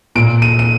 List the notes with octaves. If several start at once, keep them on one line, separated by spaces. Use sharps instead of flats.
A#2 D7
D#7
D#7